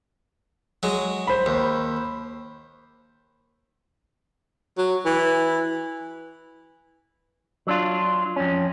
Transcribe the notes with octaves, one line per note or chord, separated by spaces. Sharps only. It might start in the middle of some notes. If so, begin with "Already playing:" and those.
F#3 G#3
C5 B5
D#2
F#3
E3
F#3 D4 F4
F2 C#4